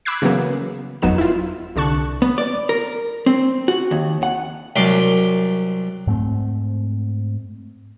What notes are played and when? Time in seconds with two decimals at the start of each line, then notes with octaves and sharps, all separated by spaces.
0.05 B5 D6 E6 F#6 G#6 C7
0.22 C#3 E3 F#3 A#3 B3
1.02 G1 F2 F#3 B3 D#4 E7
1.18 E4 F4
1.76 C2 D3 A5 C#6 F#6
2.22 B3
2.38 D5
2.69 A#4
3.26 C4
3.68 F#4
3.91 D#2
4.23 F#5
4.76 C2 F#2 C6 D6
6.07 G#2 A3 C4